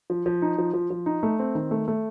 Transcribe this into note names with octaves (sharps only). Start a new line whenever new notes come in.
F3
F3
D#4
F3
F3
F3
D#4
A3
C4
D#3
A3
A3